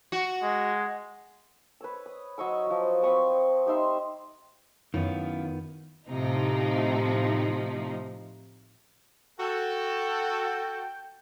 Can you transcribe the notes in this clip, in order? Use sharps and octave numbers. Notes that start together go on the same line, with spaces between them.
F#4
G#3
B4 C#5 E6
D#6
F#3 D#5 C#6 E6
F3 F#3
C4 B5 C#6 D#6
G3 D#4 E5 C6
F#2 D#3 B3 E4 F4
A2 C3 F3 D#4
F#4 A4 G5